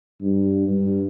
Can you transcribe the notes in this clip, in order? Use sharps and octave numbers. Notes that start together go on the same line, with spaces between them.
G2
G2